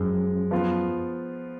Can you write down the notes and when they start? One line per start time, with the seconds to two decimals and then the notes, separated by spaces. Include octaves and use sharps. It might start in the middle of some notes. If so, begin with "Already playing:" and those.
Already playing: F#2 F3 G#3
0.51 F3 B3 F4